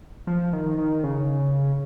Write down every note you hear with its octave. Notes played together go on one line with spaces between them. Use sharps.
F3
D#3
D#3
C#3